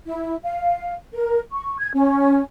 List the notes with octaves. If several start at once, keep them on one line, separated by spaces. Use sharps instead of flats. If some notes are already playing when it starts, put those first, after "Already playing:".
E4
F5
A#4
C#6
G#6
C#4